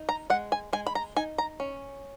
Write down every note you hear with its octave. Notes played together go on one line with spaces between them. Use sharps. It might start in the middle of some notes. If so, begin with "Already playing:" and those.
Already playing: D#4
A#5
G#3 F#5
G#5
G#3 G#5
B5
A#5
D#4 G#5
A#5
C#4